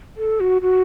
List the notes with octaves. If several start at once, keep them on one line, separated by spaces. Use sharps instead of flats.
A4
F#4
F#4